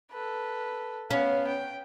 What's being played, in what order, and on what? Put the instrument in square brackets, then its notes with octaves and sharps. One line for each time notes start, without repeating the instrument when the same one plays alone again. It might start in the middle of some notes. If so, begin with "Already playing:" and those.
[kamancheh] A4 B4
[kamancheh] B3 F5 [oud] C#4
[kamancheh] G5